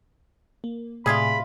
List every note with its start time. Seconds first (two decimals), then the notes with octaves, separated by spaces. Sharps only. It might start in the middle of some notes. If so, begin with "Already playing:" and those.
0.64 A#3
1.06 A2 C3 G3 A3 F4 G#4 B5